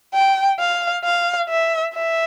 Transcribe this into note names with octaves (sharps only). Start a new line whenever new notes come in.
G5
F5
F5
E5
E5